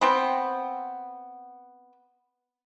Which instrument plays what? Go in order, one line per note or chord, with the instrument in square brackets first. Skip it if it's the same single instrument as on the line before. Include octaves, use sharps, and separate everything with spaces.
[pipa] B3 C4 G5